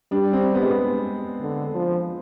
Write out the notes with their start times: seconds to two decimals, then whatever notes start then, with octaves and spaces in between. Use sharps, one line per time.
0.11 G3 D4
0.33 C4
0.55 B3
0.63 G#3
0.70 B3
1.42 D3
1.75 F3